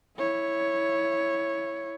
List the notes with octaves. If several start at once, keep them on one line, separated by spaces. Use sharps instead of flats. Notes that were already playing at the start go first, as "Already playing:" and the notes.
E4 C#5